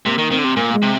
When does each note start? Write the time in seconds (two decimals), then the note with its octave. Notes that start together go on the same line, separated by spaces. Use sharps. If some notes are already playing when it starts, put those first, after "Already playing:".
0.06 C3 A#3
0.18 D#3
0.31 D#3 C4
0.38 D3
0.44 C3
0.57 A#2 A#3
0.74 G#3
0.82 C3